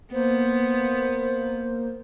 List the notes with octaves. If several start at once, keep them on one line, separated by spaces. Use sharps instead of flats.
A#3 B3 C5